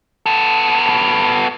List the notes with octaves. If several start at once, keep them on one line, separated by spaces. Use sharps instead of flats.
B3 A4